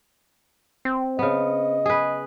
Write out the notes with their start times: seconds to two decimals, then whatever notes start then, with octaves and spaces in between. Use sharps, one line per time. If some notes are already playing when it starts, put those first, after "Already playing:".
0.85 C4
1.19 C#3 B3 D#5
1.86 G#4 B4